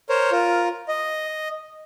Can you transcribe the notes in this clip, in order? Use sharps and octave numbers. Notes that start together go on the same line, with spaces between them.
A#4 C5 C#5
F4 A#4
D#5